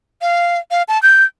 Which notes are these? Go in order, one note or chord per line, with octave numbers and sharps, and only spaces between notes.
F5
F5
A5
G6